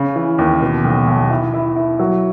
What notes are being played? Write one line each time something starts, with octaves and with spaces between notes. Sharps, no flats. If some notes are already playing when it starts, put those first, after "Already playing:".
Already playing: C#3
E3
D#2
B2
B1
B1
E4
E4
E4
F#3